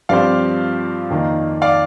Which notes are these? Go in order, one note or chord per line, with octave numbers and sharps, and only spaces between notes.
G2 F3 C4 G4 C5 D5 F5
F2 D#3 A#3 D#4
D5 F5